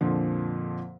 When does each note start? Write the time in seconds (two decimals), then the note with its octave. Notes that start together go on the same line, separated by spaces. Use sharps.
0.01 F2 A#2 D3 F3